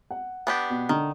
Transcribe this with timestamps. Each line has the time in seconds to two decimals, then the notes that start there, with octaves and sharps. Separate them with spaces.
0.11 F#5
0.47 B3 D4 G4
0.70 B2
0.89 D3 D#3 D4